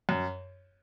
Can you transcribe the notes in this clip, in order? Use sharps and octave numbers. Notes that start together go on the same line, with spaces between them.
F#2